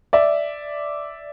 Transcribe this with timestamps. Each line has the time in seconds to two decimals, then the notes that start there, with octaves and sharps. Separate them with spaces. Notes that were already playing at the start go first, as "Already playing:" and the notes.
0.13 D5 E5